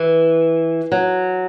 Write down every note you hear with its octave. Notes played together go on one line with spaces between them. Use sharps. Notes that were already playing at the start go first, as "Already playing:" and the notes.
Already playing: E3
F#3